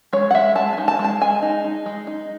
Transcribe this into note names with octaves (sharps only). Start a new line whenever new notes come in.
G#3 C#5
F#5
G#3 E5
G#3 A5
D#4 G#5
A5
G#3
A5
G#3 G#5
D#4
D#4
G#3
D#4